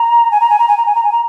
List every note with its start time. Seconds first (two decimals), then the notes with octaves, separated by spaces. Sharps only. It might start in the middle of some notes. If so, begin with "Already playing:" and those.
Already playing: A#5
0.31 G#5
0.40 A#5
0.50 G#5
0.59 A#5
0.68 G#5
0.77 A#5
0.86 G#5
0.95 A#5
1.04 G#5
1.12 A#5